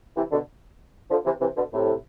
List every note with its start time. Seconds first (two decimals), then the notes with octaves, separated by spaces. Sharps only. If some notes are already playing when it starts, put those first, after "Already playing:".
0.16 C3 E3
0.32 B2 D3
1.11 D3 F3
1.25 C3 E3
1.41 C3 E3
1.57 B2 D3
1.73 A2 C3